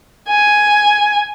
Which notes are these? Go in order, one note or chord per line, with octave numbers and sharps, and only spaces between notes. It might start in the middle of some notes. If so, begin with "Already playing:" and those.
G#5